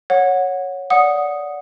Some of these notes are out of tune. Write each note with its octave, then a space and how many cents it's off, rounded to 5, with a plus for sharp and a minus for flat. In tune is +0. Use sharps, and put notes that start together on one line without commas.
C#5 +0 F#5 -15
D5 -15 F#5 -10 D#6 +0